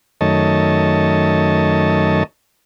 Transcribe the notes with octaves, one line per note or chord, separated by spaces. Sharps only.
F#2 D#3 A3 C#5 D#5 A5